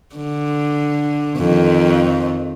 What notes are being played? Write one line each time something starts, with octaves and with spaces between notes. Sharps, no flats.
D3
F2 D#3